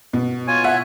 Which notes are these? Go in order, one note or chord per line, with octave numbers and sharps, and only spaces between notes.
B2
F4 C#5 G#5
E5 F#5